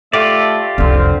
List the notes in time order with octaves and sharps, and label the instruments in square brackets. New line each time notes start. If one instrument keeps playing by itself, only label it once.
[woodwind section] A3 E5 [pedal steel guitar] F4 G4 D5
[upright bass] C2 F2 [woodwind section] D3 C4 F5